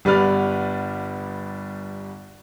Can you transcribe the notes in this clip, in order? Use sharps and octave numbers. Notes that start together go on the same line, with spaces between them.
G1 G3 B3 B4 D5 F6